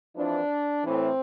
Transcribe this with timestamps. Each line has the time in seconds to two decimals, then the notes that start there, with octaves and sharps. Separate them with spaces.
0.15 F2 E3 D4
0.84 A2 E3 C4